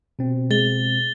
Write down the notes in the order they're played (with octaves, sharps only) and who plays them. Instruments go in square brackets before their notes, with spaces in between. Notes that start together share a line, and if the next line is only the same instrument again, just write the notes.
[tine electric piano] B2 C4
[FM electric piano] G#3 [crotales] A6 G7